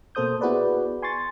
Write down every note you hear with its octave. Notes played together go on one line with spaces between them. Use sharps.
B2 A#3 A4 C5 D#6 G6
B3 E4 F#4 G#4 B4 D5
G#5 C6 C#6 A6